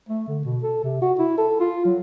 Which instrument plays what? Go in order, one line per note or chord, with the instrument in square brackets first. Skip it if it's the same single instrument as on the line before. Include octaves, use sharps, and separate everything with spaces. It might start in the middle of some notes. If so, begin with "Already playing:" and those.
[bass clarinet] A3
D3
B2
A4
C3
F#4
E4
A4
F4
F#3